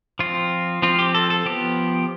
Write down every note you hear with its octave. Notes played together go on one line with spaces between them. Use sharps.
F3 C4 F4
F3 C4 F4
G4
A4
A4
F3 B3 G4